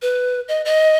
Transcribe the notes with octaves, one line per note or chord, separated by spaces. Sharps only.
B4
D#5
D#5